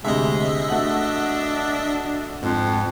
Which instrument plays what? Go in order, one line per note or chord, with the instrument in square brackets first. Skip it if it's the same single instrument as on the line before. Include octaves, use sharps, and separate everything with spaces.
[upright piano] D2 C3 [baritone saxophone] G#3 [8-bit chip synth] D#5 E5
[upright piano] A3 F#4 F#7 [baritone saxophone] D4
[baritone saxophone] F2 [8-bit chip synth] G#2